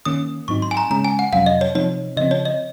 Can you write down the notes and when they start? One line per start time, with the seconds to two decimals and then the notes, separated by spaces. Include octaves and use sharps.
0.05 D#3 A#3 C#4 D#6
0.48 G#2 F#3 C4 D#4 C#6
0.62 C6
0.71 G#5
0.77 A#5
0.91 C#3 G#3 C#4 A#5
1.05 G#5
1.19 F#5
1.32 F2 C3 F#3 C#4 F5
1.46 D#5
1.61 C#5
1.75 C3 F3 C4 D#4 C#5
2.17 C#3 F3 C4 D#5
2.31 C#5
2.45 D#5